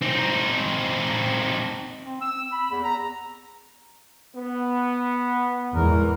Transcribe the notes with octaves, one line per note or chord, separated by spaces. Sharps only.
C4 D#4
C4
E6
B5
E2
A#5
B3
E2 G#2 E3 A#4